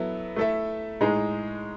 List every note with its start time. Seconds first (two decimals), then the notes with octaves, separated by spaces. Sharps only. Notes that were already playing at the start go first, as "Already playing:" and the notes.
Already playing: F#3 B3 E4 A4
0.36 A3 E4 A4 E5
1.01 A2 G#3 D#4 G#4